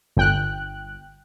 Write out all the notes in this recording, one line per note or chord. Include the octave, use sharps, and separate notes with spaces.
G1 G5 F#6